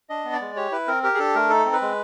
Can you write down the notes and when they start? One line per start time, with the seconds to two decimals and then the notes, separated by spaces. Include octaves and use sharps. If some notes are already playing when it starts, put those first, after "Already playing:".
0.09 D4 D#5
0.25 B3
0.33 D5
0.41 G#3
0.56 G4 C#5
0.72 E4 B4
0.88 C4 A#4
1.03 G4 A#4
1.14 G#4
1.19 D4 A4
1.35 A3 A#4
1.50 D#4 A4
1.66 C4
1.73 B4
1.82 G#3